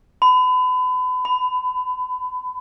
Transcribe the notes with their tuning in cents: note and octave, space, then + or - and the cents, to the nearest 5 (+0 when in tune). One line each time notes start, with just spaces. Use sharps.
B5 +35
B5 +20